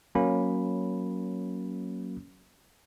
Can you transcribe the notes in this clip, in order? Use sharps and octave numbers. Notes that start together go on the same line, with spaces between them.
F#3 A#3 C#4 B5